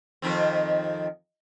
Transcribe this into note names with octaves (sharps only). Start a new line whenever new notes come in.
F2 D#3 C4